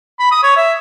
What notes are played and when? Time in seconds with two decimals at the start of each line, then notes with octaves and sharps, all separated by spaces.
0.19 B5
0.31 D#6
0.43 C#5
0.56 E5